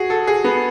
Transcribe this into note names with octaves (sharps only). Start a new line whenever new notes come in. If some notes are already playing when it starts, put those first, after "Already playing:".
Already playing: F#4 G#4
A4
G#4
B3